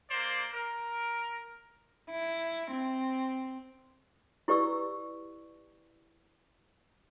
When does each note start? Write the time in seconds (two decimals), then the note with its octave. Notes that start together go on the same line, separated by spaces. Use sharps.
0.10 A#3 C5 D5
0.53 A#4
2.11 E4
2.71 C4
4.48 E4 G4 B4 D5 C#6 E6